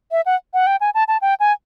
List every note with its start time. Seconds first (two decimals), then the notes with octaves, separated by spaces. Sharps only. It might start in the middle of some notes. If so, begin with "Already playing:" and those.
0.12 E5
0.26 F#5
0.54 F#5
0.67 G5
0.81 G#5
0.95 A5
1.08 A5
1.22 G5
1.40 G#5